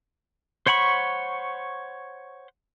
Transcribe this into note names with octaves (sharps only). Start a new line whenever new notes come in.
C5 C#5 F#5 B5 C#6